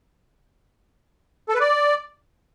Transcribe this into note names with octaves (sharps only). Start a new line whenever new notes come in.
A4
B4
D5